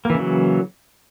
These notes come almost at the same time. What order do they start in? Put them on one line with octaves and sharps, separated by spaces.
A#3 E3 C#3 F#3